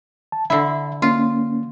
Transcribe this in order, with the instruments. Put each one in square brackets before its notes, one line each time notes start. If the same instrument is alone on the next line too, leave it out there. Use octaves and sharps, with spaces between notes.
[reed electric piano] A5
[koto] D3 E4 [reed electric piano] E5
[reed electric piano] A#3 C#4 [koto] F4